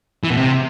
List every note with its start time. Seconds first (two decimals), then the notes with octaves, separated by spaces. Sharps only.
0.24 E3
0.30 B2
0.37 C3